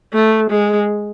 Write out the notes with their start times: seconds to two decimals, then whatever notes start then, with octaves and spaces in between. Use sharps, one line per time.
0.14 A3
0.51 G#3